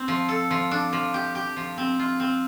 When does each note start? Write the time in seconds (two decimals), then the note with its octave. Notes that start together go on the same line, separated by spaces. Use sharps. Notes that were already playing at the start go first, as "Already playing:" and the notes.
Already playing: C4
0.08 F3
0.29 A4
0.51 F3
0.71 D4
0.93 F3
1.14 G4
1.35 G4
1.56 F3
1.78 C4
1.99 F4
2.20 C4